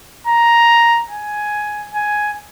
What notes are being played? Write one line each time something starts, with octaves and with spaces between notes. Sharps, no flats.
A#5
G#5
G#5